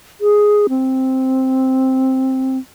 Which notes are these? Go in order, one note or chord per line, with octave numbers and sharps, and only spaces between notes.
G#4
C4